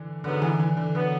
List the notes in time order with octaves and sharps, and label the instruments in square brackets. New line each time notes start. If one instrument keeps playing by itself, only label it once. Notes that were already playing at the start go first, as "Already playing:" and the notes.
Already playing: [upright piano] D3 E3
[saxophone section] G#2 F#3 B3 [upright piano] D3
[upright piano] E3
E3
D3
[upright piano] D3 [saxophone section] F#3 B3